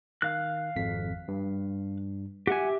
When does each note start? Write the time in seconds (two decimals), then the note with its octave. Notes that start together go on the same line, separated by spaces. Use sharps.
0.22 D#3 F5 F#6
0.76 G#1 F2 B6
1.28 G2
2.47 G4 E5 F#5 G#5